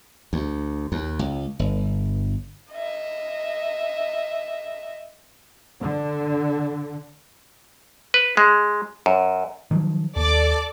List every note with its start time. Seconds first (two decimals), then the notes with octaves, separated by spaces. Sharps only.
0.33 D2
0.92 D#2
1.19 C#2
1.59 G1
2.72 D#5 E5
5.80 D3
8.14 B4
8.37 G#3
9.06 F#2
9.71 D#3 F3 F#3
10.16 D#2 A4 D5 D6